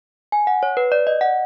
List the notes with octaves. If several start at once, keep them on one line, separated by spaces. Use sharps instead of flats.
G#5
F#5
C#5
B4
D5
D#5
F#5